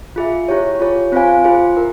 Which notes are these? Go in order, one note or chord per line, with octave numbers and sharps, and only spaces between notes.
F4 G#4 E5
E4 G4 C#5
F4 G#4 C#5
C4 F4 C5 F5 G#5
F4 G#4 C5
E4 A#4